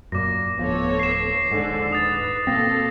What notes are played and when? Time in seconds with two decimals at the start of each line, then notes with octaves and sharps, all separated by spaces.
0.12 F#2 A#2 D6 A#6
0.58 D1 F3 B3 A4 C#5
0.99 C7 E7
1.52 D#1 G#2 D3 F3 A4
1.92 B4 D#6 A6
2.47 B2 A#3 C4 A4 A#6